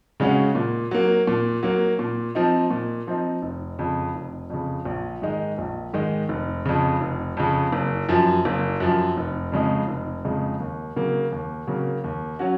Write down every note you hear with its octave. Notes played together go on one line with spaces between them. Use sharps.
C#3 G#3 C#4 F#4
A#2
F#3 A#3
A#2
F#3 A#3
A#2
F3 C4 D#4
A#2
F3 C4 D#4
F1
F2 C#3
F1
F2 C#3
A#1
G#2 D#3 G#3 D#4
A#1
G#2 D#3 G#3 D#4
F1
F2 C#3
F1
F2 C#3
F#1
F#2 F3
F#1
F#2 F3
F1
F2 C#3 G#3 D#4
F1
F2 C#3 G#3 D#4
D#2
C#3 F#3 A#3
D#2
C#3 F#3 A#3
D#2
F#3 C#4 F#4